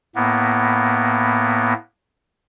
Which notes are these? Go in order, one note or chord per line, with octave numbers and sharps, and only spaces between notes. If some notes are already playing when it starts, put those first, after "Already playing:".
A2 A#3 B3